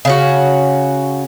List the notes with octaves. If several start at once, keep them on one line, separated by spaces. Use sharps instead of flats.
C#3 C#4 F#4